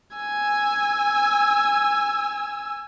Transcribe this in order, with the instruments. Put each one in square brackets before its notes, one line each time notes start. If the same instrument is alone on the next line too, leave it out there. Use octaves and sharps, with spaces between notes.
[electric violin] G#5 E6